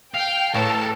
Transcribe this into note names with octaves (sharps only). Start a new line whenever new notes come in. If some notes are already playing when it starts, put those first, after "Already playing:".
F5 G5
A2 E3 C#4 A4 A#4 A5